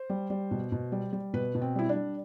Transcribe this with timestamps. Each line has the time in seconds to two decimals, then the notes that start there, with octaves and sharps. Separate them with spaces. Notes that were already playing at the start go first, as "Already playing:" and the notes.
Already playing: C5
0.10 G3
0.30 G3
0.51 B2
0.72 B2
0.92 G3
1.13 G3
1.34 B2 B4
1.55 B2
1.62 C4
1.76 G3 E4
1.89 D4
1.96 G3